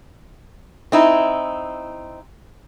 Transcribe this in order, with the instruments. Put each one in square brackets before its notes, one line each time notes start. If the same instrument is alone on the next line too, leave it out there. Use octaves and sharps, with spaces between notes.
[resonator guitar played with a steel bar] C4 D#4 E4